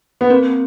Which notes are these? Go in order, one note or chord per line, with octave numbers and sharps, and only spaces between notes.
B3
A#3 C4